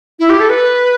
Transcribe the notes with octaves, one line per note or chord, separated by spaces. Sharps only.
E4
G4
A4
B4